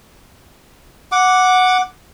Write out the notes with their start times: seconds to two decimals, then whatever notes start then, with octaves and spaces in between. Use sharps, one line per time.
1.12 F#5 D6